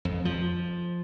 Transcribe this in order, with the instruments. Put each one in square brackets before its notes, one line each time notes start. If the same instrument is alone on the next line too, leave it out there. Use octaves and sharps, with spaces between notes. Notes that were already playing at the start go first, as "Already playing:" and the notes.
[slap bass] F2
F3